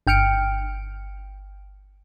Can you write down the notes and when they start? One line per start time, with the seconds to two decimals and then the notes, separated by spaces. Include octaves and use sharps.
0.07 G1 G5 F6 C#7 D7